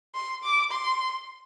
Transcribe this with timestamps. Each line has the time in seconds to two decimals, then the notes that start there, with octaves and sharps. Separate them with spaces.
0.15 C6
0.43 D6
0.71 C6